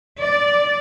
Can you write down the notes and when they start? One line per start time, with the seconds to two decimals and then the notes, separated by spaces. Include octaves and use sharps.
0.20 D5